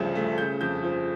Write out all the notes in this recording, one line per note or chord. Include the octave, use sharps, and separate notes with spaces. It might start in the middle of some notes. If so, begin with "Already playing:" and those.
Already playing: D2 G2 C#3 F3
A3
C#3 G6
F2 G6
F3